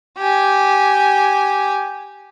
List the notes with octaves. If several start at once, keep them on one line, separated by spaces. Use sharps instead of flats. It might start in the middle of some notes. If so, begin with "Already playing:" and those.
G4 G#5